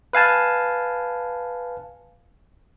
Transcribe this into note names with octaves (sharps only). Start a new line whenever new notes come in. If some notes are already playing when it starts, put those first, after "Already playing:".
B4 F5 G#5 A5